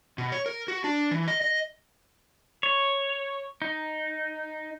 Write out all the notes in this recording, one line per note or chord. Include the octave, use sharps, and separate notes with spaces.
B2
C#5
A#4
F#4
D4
E3
D#5
D#5
C#5
D#4